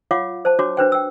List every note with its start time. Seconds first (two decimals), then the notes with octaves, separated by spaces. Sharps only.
0.11 F4 C#5 F5 F#5 D6
0.45 C5 A5
0.59 D4 F#4 C#5 D6
0.77 D4 B4 C5 G5
0.92 G5 E6